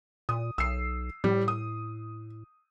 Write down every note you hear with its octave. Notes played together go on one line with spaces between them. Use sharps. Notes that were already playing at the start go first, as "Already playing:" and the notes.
A#2 D#6
B1 E6 C7
A2 G3
D#6